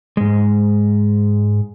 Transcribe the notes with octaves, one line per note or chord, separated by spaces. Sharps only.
G#2 G#3